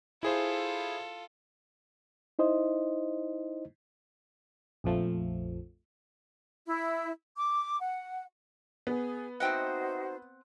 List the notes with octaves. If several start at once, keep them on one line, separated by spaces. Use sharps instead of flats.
E4 F4 G#4 A4 C5
D#4 E4 C5 D#5
A#1 F2 F3 A3
E4
D6
F#5
B3 G#4
C4 D#4 F#4 C5 D#5 E5 F#5 G5